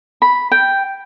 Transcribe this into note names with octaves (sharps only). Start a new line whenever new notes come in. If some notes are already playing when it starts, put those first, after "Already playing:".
B5
G5